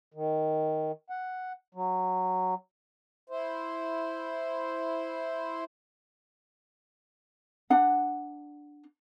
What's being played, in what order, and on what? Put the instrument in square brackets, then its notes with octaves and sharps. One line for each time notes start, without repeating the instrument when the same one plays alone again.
[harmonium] D#3
F#5
F#3
E4 C5
[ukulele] D4 F#5